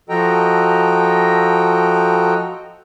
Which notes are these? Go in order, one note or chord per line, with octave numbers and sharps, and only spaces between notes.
F3 F#4 A4 D#5 G5 A#5